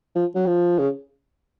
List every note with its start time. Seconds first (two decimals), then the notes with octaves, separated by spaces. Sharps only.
0.15 F3
0.36 F#3
0.47 F3
0.79 C#3